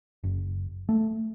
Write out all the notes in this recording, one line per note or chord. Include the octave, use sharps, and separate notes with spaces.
F#1
A3